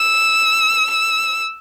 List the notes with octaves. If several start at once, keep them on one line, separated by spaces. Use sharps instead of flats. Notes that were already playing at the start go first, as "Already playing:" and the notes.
Already playing: E6
E6